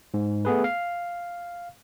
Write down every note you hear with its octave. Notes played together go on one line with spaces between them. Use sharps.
G#2
A3 B3 G#4 B4
F5